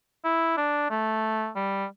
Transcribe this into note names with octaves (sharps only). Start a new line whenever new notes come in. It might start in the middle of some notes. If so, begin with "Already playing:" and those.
E4
D4
A3
G3